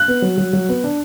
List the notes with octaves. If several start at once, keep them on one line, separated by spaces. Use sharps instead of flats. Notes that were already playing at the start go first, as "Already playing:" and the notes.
Already playing: F#6
B3
F#3
F#3
F#3
B3
D4